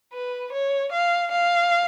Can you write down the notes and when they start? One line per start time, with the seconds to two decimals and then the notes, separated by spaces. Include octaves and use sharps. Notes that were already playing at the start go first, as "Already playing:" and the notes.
0.13 B4
0.53 C#5
0.92 F5
1.32 F5